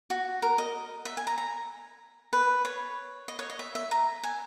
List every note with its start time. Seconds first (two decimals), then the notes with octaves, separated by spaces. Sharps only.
0.10 F#4
0.42 A#4
0.58 D#5
1.05 E5
1.17 G#5
1.27 A#5
1.38 A#5
2.33 B4
2.65 C#5
3.28 D#5
3.39 C#5
3.50 D#5
3.59 E5
3.75 E5
3.91 A#5
4.23 G#5